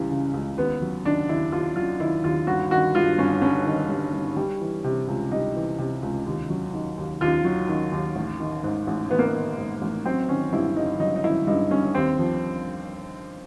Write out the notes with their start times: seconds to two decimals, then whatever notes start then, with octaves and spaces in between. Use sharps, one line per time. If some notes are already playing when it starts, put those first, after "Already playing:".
Already playing: C#2 C#3 E3 G3
0.10 C#3
0.34 C#2
0.57 D#2 B3
0.82 F#3
1.05 D#3 D4
1.29 D#2 E4
1.52 D#2 F4
1.76 F#3 F4
2.00 D#3 E4
2.23 D#2 F4
2.47 G1 F#4
2.71 D#3 F#4
2.95 G2 F4
3.18 G1 C#4
3.42 G1 C#4
3.66 D#3
3.89 G2
4.13 G1
4.36 G3
4.61 E3
4.84 C3
5.08 C#2
5.31 G3 D#4
5.55 E3
5.78 C3
6.03 C#2
6.26 D#2
6.50 F#3
6.74 D#3
6.97 D#2
7.21 D#2 F4
7.45 F#3
7.68 D#3
7.92 D#2
8.16 A1
8.40 D#3
8.63 G#2
8.87 A1
9.10 A1 B3
9.19 A#3
9.26 B3
9.35 D#3
9.58 G#2
9.82 A1
10.05 F#3 C4
10.29 D#3 C#4
10.53 G2 E4
10.76 G1 D#4
11.00 F#3 D#4
11.16 D#4
11.23 D#3 E4
11.47 G2 D#4
11.71 G1 C#4
11.95 D#2 C4
12.19 F3